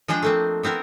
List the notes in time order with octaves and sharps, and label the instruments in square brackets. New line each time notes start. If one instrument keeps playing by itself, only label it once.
[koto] F3 G#3 D4 G#4 D#5 G5
A3 A#3 C4
B3 C4 E4 A#4